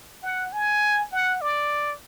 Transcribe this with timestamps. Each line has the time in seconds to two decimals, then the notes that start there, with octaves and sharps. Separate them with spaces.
0.23 F#5
0.53 G#5
1.12 F#5
1.41 D5